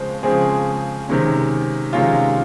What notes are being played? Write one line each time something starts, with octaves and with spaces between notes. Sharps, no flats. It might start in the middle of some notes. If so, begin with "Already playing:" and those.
Already playing: C#3 F3 G#3 C4 C5
C#3 F3 G#3 C4 G#4
C3 D#3 G#3 C#4
C3 D#3 G#3 C#4 F4